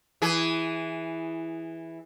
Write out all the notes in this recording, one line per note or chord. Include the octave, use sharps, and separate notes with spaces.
E3 G#4